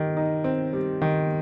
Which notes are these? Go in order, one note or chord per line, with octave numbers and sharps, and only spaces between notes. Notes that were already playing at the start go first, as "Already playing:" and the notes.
Already playing: D#3 G3
D#4
C4
G3
D#3